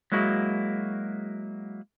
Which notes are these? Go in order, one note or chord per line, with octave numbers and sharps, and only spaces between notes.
F#3 G#3 A#3 E4 F#4 G#4